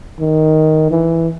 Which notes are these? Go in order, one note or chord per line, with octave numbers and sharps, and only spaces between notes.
D#3
E3